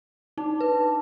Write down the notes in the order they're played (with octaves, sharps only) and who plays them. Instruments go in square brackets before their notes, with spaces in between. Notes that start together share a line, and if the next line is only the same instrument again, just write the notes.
[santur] D4 [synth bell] D#4
[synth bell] B4